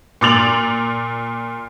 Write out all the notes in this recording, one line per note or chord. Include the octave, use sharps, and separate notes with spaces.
A#2 C6 D6 A6 F7 F#7